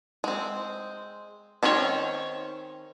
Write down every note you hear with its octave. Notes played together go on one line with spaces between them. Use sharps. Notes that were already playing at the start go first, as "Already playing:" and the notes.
G#3 C4
D#3 C4 C#4 F4 C#5